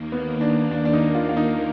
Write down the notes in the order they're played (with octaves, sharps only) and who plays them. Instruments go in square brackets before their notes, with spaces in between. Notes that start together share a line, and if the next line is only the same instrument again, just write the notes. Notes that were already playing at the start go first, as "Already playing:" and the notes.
Already playing: [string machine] D#2 D#3 A#3
[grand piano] B3
D4
D4
D4
D#4
F4
F4
D#4